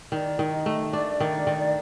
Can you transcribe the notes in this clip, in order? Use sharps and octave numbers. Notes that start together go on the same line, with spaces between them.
D#3 D5
D#3
D#5
A3
D4 D5
D#3
D#3